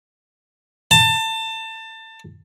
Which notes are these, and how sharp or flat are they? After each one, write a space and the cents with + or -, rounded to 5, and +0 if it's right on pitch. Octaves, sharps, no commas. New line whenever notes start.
A5 +25